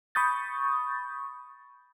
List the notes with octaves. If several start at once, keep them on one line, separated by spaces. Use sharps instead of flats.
B5 C#6 D#6 G6 A6